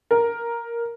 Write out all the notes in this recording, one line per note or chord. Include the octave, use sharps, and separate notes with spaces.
A#4